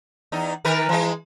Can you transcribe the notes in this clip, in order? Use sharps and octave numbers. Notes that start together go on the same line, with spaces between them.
E2 D#4
D#3 A#4 B4
E3 G#3